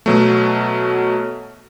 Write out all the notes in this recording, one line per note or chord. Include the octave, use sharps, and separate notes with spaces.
B2 F#3 A3